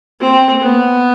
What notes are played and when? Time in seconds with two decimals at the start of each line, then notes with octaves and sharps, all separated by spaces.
0.20 C4
0.61 B3